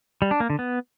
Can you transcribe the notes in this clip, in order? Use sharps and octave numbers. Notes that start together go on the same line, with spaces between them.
G3
D4
A#3
D3
B3